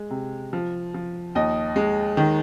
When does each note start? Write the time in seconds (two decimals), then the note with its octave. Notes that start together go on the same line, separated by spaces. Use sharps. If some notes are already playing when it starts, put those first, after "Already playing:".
Already playing: G#3
0.10 C3
0.53 F3
0.94 F3
1.35 D#2 D#5
1.76 G#3
2.17 D#3